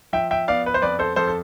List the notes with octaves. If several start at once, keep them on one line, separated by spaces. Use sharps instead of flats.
F3 E5 G5
E5 G5
B3 D5 F5
B4
C5
F2 B4 D5
A4 C5
F2 A4 C5
A4